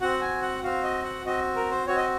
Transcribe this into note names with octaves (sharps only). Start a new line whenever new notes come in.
C4 F#4 F#5
G#5
F#5
C4 F#4 F5
D#5
F#5
C4 F#4 D#5
A#4
C5
C4 F#4 C#5
D#5